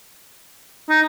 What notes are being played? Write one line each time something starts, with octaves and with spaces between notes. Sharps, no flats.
D#4